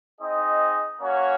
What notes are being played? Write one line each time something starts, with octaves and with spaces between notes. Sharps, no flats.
C4 D#4 G#4 D#5
A#3 C#4 F#4 C#5